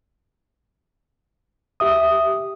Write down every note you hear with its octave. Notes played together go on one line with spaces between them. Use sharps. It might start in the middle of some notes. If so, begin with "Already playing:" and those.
G4 E5 D#6